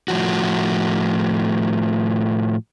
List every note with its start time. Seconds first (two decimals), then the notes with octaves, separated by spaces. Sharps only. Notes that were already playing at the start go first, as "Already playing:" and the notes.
0.08 A2 F3 F#4